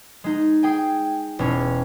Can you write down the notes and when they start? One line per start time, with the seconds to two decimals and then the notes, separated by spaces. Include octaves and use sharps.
0.24 G#3 D#4
0.63 G#4 G5 G#5
1.39 E1 C#4